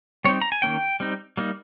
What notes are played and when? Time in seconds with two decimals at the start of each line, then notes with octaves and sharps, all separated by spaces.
0.25 G3 C4 D#4 C#5
0.41 A#5
0.52 G#5
0.62 D#3 A#3 C#4 G5
1.00 G3 C4 D#4
1.37 G3 A#3 D#4